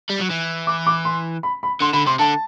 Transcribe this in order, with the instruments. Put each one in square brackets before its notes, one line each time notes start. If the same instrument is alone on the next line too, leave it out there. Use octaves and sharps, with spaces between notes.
[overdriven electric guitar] G3
F#3
E3
[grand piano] D6
D6
C6
B5
B5
[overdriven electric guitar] D3 [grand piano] C6
[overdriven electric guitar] D3 [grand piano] B5
[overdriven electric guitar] C3 [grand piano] C6
[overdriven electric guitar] D3 [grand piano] A5